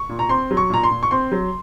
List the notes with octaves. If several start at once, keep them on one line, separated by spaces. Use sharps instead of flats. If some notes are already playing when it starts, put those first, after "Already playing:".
Already playing: C#6
A#2
A#5
C4 C6
F#3
C#6
A#2 A#5
C6
A#2
C#6
C4 C6
F#3